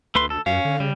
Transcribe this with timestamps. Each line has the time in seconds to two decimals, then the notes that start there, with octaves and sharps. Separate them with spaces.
0.15 D2 A3 B4 C6
0.30 A4
0.46 F#2 C#4 F5
0.65 D3
0.80 C#3 G3